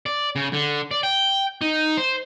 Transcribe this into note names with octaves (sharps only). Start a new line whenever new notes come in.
D5
C#3
D3
D5
G5
D#4
C5